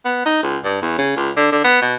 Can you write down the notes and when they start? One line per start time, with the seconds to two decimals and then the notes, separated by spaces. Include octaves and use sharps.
0.05 B3
0.26 D#4
0.43 C#2
0.64 G2
0.82 E2
0.98 C#3
1.17 C#2
1.37 D3
1.52 D3
1.64 B3
1.82 B2